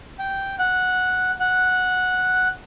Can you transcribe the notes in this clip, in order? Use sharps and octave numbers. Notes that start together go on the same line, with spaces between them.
G5
F#5
F#5